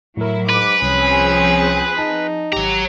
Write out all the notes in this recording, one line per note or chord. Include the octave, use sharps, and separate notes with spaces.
A2 F#3 E4 A#4
G#2 B4 D6
C2 F3 C4 C#4 G#4
D#4 A5
G#1 F#3 G4 A#5